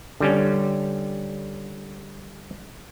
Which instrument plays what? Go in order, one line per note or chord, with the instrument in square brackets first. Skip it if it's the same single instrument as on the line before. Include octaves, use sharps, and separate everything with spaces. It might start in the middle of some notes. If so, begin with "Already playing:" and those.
[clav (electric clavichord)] D3 G3 C#4